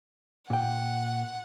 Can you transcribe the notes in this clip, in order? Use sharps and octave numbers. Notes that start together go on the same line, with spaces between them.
A#2 F#5 G5